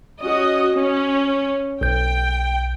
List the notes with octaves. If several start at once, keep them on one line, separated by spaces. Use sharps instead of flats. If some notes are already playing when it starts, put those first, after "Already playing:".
C#4 F#4 D#5
C#4
B1 G5 G6